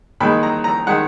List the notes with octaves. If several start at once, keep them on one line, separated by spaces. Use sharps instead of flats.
D#2 D#3 G#3 B5
A#5
A#5
D#3 G#3 F#5